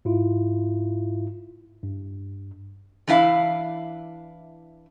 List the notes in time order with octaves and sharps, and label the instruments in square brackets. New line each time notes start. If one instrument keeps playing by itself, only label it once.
[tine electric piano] G#2 E4 F4
G2
[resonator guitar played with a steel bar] E3 D4 E4 F5